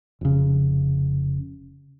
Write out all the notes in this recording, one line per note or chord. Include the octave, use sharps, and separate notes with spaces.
F1 C#3